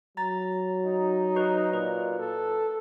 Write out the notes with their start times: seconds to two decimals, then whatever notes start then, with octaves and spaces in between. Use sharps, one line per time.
0.17 F#3 A#5 A6
0.86 D#4
1.36 F#4 B4
1.73 A#2 B4
2.19 A4